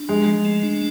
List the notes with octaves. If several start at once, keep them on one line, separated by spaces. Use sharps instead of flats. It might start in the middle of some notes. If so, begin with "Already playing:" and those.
Already playing: D4
F3 G#3
F3
A3
D4